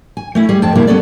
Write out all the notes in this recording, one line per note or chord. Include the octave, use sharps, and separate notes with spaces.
G#5
A3 C#4 E4
G3 G#4
F2 G5 A5
C#3 G3 G#3 A#3 C4 E4
G3 B3 C#4 A4 D5